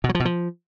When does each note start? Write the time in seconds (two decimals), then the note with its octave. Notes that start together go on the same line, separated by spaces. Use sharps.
0.04 B2
0.09 F#3
0.15 F3
0.20 B2
0.25 F3